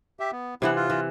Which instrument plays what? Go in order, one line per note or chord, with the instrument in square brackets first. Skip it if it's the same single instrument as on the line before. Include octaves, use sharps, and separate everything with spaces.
[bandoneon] G4 E5
B3
[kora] C3 E3 F#5 [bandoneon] B3 E4
[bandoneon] F4
[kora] E3